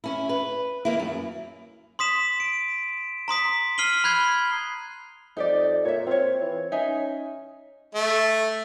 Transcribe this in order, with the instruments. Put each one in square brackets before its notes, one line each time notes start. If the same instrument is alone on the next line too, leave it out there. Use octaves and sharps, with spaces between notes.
[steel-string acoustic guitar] C#4 E4
B4
D#3 A#3 E4
F#2
[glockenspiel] C6 D#6 B6 E7
D7
A#5 C6 D#6 B6
F6 C7 D#7 F#7 G7
B5 F#6 G#6 C7 G7
[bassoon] F2 [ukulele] D#4 G4 D5
[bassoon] A#2 [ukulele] C#5 E5
[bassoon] C4 [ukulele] F4 C#5
[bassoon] E3
[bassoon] C#4 [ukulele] D#4 E5 G#5
[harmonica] A3